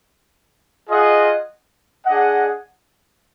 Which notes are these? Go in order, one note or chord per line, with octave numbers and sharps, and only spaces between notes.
F4 G#4 D#5 F#5
D4 G#4 D#5 F#5